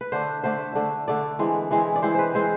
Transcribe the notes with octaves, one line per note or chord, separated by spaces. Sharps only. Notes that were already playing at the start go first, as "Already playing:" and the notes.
B4
D3 A3 D4 C5
D3 A3 D4 C5
D3 A3 D4
D3 A3 D4 D5
E3 G#3 C4
E3 G#3 C4
D5
E3 G#3 C4 C5
B4 C5
E3 G#3 C4 C5